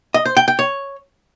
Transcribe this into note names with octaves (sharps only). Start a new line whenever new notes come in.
D#5
C5
G5
G5
C#5